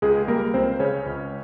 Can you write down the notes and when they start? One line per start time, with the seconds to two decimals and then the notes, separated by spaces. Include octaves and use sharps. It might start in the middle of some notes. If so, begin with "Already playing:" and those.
0.02 C#2 G#3 G#4
0.28 G3 A#3 A#4
0.54 C#2 C4 C5
0.79 C#3 C#4 C#5
1.06 C#2